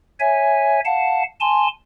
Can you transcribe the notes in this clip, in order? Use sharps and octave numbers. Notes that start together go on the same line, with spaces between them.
C#5 E5 G#5
F5 F#5 A5
G#5 A5 C6